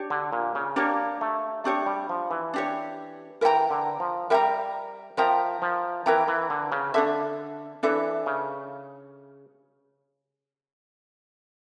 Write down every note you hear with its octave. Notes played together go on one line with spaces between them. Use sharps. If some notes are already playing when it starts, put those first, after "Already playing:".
Already playing: D4 G4 C#5
D3
A#2
C#3
A#3 D4 G4 C#5
A3
A3 D4 G4 C#5
G3
F3
E3
D4 G4 C#5
E3 A#4 E5 G5 A#5
D3
F3
G3 A#4 E5 G5 A#5
F3 A#4 E5 G5 A#5
F3
E3 A#4 E5 G5 A#5
E3
D3
C#3
D3 D4 A4 E5
E3 D4 A4 E5
C#3